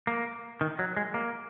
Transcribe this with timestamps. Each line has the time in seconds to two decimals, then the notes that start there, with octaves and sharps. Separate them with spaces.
0.07 A#3
0.61 D#3
0.79 F#3
0.97 G#3
1.14 A#3